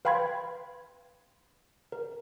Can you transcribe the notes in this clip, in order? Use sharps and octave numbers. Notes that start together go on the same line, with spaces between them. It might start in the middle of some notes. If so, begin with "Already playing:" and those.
B4 F5 G5 B5 C6 G#6
A#4